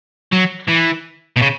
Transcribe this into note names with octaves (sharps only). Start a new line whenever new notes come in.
F#3
E3
B2
C#3